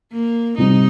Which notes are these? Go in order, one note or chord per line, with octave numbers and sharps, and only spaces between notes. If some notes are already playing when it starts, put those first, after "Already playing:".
A#3
C3 G3 C4 D#4